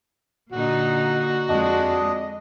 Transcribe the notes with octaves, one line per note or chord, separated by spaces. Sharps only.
A#2 D3 D#4 F#4
F2 G#3 C4 D4 D#5